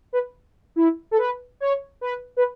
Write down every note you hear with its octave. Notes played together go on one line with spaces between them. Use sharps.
B4
E4
A4
B4
C#5
B4
B4